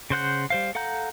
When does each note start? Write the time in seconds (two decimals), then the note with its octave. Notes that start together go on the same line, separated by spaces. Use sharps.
0.10 C#3 C5 F#5 G6
0.50 G3 C5 F5
0.75 A4 F5 F#5 A#5 G6